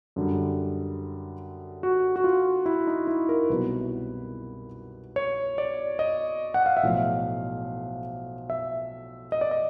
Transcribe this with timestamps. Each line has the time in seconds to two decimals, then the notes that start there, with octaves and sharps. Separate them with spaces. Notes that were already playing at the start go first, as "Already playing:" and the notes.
0.16 F#2 D3 G3
1.83 F#4
2.16 F#4
2.24 F4
2.66 E4
2.87 D#4
3.07 E4
3.29 A#4
3.50 C2 B2 F#3 B4
5.16 C#5
5.58 D5
5.99 D#5
6.54 F#5
6.66 F5
6.77 E5
6.83 B1 A2 F3 F5
8.50 E5
9.32 D#5
9.41 D5
9.51 D#5